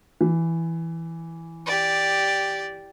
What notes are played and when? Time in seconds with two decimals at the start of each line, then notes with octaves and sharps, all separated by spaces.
0.21 E3
1.67 G4 D5